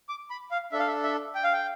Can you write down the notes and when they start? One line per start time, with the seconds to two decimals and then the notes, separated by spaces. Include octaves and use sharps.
0.09 D6
0.30 B5
0.51 F5
0.72 D4 A4 E5
0.79 F5
0.87 E5
1.03 E5
1.35 G5
1.44 F5
1.53 G5